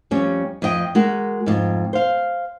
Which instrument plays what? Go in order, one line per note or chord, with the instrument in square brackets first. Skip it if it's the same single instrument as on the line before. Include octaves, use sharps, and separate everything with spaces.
[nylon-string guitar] F2 G3 C#4
F2 C4 D#5 G5
G#3 F#4 A#4
F2 G#2
C5 F5